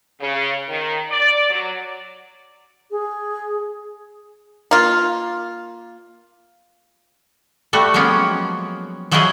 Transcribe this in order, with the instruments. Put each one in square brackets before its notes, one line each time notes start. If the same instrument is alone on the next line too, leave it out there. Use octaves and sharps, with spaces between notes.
[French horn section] C#3
D#3
D5
F#3
[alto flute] G#4
[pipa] A#3 F4
[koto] G3 A3 F#4
F3 F#3 G#3 A#3 B3 C#4
F3 F#3 D#4 E4 G#4 D#5